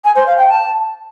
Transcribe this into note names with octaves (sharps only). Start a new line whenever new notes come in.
G#5
C5
F5
G5
A5